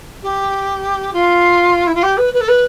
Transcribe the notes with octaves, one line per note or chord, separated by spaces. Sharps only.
G4
F4
E4
F4
G4
B4
B4
A4
B4